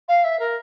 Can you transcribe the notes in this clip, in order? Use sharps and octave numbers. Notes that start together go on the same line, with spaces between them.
F5
E5
A#4